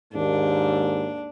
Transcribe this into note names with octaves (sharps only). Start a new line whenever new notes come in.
D#2 G#2 A#3 D4